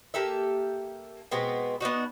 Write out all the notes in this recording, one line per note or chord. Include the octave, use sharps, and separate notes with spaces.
A#3 G4 A4 E5
B2 G#3 B3 C4
B3 D4 D#4 F#4